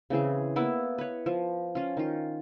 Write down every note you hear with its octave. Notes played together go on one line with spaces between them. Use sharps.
C#3 E3 C4 G#4
A#3 B3 E4 E5
B4 C#5
F3
C#4 F4
D#3 F4